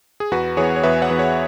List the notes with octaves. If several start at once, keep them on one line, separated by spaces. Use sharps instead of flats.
G#4
E2 F#4 B4
E3 B3 G#4 C#5
C#5
E2 B4 E5
C#5 F#5
E3 B3
G#4 C#5